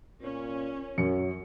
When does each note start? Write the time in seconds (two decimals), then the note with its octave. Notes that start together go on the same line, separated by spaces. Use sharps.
0.22 A#2 C#4
0.98 F#2 F#3 C#7